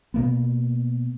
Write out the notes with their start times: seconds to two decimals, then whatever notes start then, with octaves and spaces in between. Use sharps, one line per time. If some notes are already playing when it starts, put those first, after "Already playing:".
0.14 B2 A#3 B3